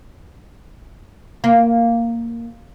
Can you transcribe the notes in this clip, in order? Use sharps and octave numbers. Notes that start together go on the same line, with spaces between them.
A#3